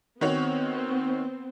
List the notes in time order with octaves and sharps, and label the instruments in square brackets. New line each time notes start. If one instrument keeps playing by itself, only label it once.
[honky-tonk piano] D#3 F#4 C#5 [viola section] B3 C4